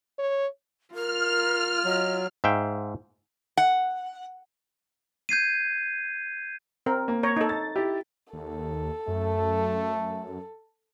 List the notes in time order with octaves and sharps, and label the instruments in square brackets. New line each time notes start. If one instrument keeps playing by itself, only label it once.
[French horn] C#5
[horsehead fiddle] F4 [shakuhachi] A#4 [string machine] F6
[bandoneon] F#3 [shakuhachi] D#5
[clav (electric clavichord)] G#2 E5 F5 G5
[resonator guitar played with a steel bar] F#5
[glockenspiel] G6 G#6 C7 D#7
[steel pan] C4 A#4
[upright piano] A#3
[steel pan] C#5 A#5
D#4 A4
[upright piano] A6
E4 G4
[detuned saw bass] D#2 [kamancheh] A4
[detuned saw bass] F#2 [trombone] A3